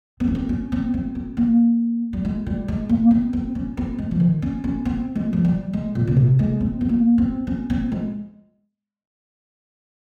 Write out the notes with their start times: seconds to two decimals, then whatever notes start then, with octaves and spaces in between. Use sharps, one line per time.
0.20 C4
0.28 C#4
0.35 C4
0.49 C#4
0.72 C4
0.94 C4
1.15 C4
1.37 A#3
2.13 G3
2.25 G#3
2.47 G3
2.68 G#3
2.89 A#3
3.11 C4
3.33 C4
3.55 C#4
3.77 C4
3.98 G#3
4.11 F3
4.20 D#3
4.42 C#4
4.64 C#4
4.85 C4
5.15 G#3
5.33 F3
5.45 G3
5.73 G#3
5.95 A#2
6.07 C#3
6.17 C3
6.39 G#3
6.60 C4
6.81 C4
6.89 A#3
7.18 C4
7.47 C#4
7.70 C4
7.92 G#3